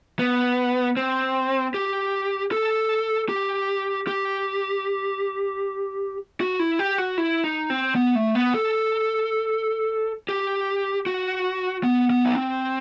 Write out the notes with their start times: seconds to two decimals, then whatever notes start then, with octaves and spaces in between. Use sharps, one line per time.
0.19 B3
0.97 C4
1.74 G4
2.52 A4
3.29 G4
4.07 G4
6.41 F#4
6.59 E4
6.79 G4
6.98 F#4
7.18 E4
7.44 D#4
7.70 C4
7.96 B3
8.15 A3
8.35 B3
8.54 A4
10.29 G4
11.06 F#4
11.84 B3
12.10 B3
12.25 D#4
12.36 C4